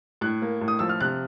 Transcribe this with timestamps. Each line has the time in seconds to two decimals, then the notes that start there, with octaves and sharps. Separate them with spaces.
0.21 A2 F#6
0.42 A#3
0.61 A2
0.68 D#6
0.79 F3 E6
0.89 F6
1.01 C3 F#6